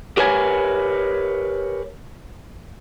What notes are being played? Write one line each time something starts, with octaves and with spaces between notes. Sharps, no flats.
G4 A#4 B4 C#5 G#5